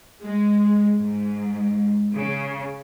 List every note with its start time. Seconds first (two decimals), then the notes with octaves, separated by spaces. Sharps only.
0.22 G#3
0.98 G#2
2.15 C#3